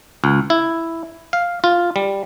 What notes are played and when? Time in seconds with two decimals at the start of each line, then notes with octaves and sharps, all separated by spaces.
0.24 C#2
0.50 E4
1.33 F5
1.64 F4
1.96 G3